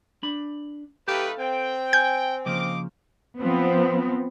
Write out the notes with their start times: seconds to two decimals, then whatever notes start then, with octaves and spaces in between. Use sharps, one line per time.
0.23 D4 B5
1.08 A3 D#4 G4 A4 B4 F5
1.39 C4 G5
1.93 G#5 G6
2.46 C#3 F3 A#3 D#5 F5 D6
3.39 F3 B3 C4